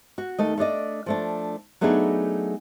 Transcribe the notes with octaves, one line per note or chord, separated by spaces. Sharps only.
F#4
D#2 A3 D#5
A3 D4 D5 D#5
F3 A3 D4
F#3 A3 B3 D4 D#4 G#4